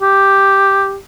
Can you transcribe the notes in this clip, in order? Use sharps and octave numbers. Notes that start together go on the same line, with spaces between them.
G4